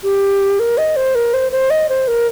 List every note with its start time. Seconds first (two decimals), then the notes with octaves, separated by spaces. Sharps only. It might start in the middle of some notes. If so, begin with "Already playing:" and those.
0.04 G4
0.60 A#4
0.78 D#5
0.96 C5
1.15 A#4
1.34 C5
1.52 C5
1.70 D#5
1.89 C5
2.08 A#4